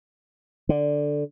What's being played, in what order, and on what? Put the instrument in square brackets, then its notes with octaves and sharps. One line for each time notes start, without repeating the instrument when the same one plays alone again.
[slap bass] D3